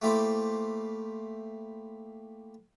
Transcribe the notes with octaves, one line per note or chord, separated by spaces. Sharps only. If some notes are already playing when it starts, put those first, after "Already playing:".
A3 A#3 E4 G4 C5